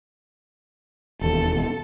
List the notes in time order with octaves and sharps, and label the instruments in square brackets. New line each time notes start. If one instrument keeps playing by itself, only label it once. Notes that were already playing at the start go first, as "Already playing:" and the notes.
[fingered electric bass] E1 D#2 B2 [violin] A4